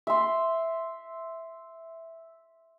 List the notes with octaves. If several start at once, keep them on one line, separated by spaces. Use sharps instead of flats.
E5 C6